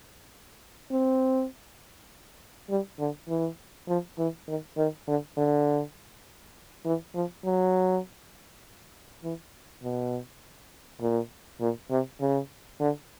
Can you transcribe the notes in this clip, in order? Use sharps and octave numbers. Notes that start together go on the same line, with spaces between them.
C4
G3
D3
E3
F3
E3
D#3
D#3
D3
D3
E3
F3
F#3
E3
B2
A#2
A#2
C3
C#3
D3